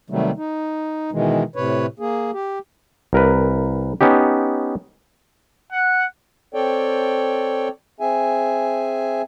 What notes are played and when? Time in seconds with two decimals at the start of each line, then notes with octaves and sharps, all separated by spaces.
0.10 C3 D#3 F#3 G3 A3
0.37 D#4
1.12 B2 D#3 E3 G#3
1.56 A2 C3 B4 C#5
1.99 A#3 G#4
2.33 G4
3.13 C2 A#4 B4
4.01 B3 C#4 D#4 G4
5.72 F#5
6.54 C4 A4 C#5 D5 G5
8.00 C4 G#4 E5 G#5